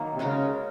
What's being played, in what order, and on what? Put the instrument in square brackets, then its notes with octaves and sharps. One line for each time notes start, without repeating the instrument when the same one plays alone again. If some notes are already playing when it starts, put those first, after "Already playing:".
Already playing: [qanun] D#3 F#3 A#3
[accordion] C3
[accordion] C#3 [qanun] G#3 C#4 F#4 A#4